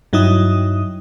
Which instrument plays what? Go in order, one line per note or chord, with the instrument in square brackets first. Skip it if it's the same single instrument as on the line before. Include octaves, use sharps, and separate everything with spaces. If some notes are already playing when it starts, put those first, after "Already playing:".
[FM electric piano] G2 F#3 D#4 E4 D#6